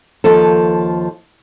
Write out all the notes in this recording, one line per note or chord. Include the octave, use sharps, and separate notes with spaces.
D#2 F3 A4